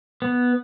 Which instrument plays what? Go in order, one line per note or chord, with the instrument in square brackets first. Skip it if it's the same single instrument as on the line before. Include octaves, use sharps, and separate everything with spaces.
[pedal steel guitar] B3